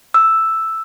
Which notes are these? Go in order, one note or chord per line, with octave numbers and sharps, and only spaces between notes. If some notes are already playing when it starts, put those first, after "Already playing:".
E6